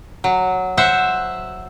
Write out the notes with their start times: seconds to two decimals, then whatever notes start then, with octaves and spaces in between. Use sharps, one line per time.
0.24 F#3
0.77 C5 E5 F#5